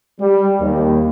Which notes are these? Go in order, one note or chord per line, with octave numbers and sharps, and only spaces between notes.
G3
D#2